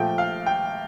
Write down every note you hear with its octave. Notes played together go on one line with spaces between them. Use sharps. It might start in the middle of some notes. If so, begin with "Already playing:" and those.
Already playing: A#2 F3 A3 G5
F5
G5